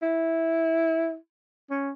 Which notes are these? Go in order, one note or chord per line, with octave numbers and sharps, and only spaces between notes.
E4
C#4